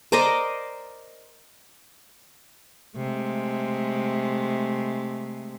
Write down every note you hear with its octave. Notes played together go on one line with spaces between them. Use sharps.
A#4 C5 D5 D#5
C3 G#3 A3